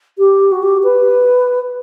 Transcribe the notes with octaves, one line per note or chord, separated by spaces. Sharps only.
G4
F#4
G4
B4